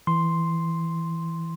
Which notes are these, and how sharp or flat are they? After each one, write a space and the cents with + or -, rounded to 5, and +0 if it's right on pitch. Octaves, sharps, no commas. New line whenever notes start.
E3 +0 C6 +0